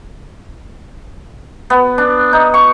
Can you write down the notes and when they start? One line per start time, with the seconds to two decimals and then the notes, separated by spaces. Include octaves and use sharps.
1.70 B3
1.98 D4
2.33 D#4
2.54 C#6